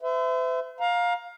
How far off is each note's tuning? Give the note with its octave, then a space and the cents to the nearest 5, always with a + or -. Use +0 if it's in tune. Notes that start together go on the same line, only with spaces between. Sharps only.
C5 -45 E5 +0
F5 +20 A#5 +15